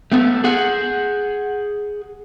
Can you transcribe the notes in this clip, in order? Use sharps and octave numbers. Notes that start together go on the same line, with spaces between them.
A3 B3 A4
G#4 F#5